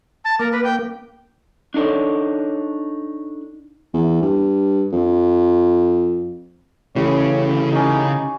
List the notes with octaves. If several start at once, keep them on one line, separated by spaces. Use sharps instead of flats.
A5
A#3 A#4
B4
G5
D4 D#4 A4 C#5
E2
G2
F2
A1 C#3 G4 B4 C#5
C#4 D#4 G4